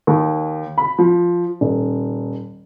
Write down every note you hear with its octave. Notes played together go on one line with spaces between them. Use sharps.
D#2
B5
F3
D#1